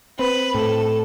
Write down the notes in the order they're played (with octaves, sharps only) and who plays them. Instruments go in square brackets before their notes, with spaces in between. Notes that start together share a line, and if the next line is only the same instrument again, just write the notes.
[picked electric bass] C4 [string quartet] B4
[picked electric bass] A2 [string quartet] A4